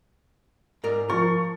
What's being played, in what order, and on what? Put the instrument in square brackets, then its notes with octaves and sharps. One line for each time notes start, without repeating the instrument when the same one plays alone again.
[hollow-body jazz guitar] G#2 A#4 D5
[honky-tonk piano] F3 C#6 A6 [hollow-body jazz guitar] A#4